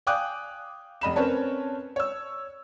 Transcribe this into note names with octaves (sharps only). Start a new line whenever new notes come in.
F5 G5 G#5 D6 D#6 F#6
F1 D#5 B5 E7
C4 C#4 A#4 B4 C#5 A5
C#5 E6